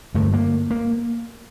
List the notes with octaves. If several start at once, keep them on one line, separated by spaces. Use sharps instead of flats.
G2 D3 A3
A#3
A#3